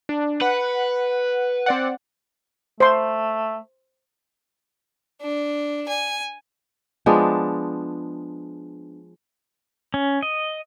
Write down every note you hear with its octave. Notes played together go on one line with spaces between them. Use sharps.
D4
B4 F#5
C4 D5 F#5
A3 C5 C6
D4
G#5
F3 G#3 B3 D4
C#4
D#5